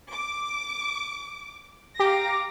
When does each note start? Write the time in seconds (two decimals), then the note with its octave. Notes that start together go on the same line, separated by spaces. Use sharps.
0.11 D6
2.00 G4 F5 A#5 D6 A#6